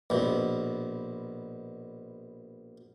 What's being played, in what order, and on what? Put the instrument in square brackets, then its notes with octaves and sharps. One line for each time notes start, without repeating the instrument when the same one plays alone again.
[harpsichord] A#1 B2